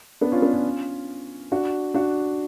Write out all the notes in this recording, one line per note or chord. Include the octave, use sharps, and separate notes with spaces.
B3 D4
C#4 F4
B3 D4
C#4 F4
D4 F#4
D4 F#4